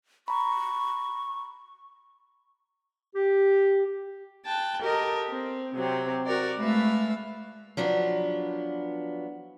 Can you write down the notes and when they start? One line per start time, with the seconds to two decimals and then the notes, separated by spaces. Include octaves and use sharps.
0.28 A#5 B5 C#6
3.15 G4
4.46 G5 A5 F#6
4.82 G4 A4 A#4 D#5
5.30 C4
5.76 C3 F#3 C4 G4
6.26 F#4 A#4 D5
6.58 G#3 A3 B4 E5 F5
7.77 F3 F#3 B3 D4